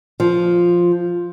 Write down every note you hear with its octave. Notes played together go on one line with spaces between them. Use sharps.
F3